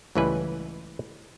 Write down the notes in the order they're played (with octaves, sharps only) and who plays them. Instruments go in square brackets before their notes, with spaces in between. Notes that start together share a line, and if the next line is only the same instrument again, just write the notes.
[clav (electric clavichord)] C#2 A2 E3 G3 B4 G#5